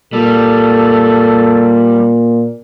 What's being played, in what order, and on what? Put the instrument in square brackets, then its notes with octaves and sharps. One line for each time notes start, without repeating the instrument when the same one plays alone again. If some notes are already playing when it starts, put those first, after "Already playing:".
[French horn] A#2 [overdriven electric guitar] G3 [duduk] A4